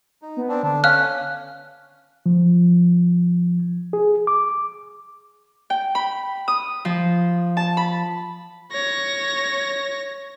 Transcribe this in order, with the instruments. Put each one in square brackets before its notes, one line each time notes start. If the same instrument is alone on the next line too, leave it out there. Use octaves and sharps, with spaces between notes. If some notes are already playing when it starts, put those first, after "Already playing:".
[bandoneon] D#4
[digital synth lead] B3
[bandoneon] C4 D4
[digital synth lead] D3 [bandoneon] D4
[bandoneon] C#4 [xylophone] F5 F6 F#6
[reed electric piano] F3
G#4
D6
[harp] G5
B5
D#6
F3
A5
B5
[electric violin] C#5 A#6